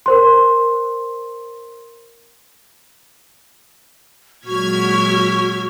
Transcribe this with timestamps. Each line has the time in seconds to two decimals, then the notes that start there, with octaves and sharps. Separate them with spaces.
0.06 A#4 C5 C6
4.46 A#2 F#3 G#3 F#4 C#6 F6 G#6 B6